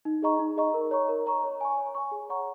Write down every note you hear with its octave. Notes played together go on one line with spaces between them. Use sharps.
D#4
G#4 D#5 A#5 C#6
D#4
G#4 D#5 A#5 C#6
A#4
C#5 A#5 C#6
A#4
C#5 A#5 C#6
C#5
G#5 C#6
C#5
G#5 C#6
G#4
C#5 F#5 A#5 C#6